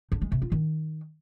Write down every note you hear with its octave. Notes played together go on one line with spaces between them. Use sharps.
D3
G#3
C3
F4
D#3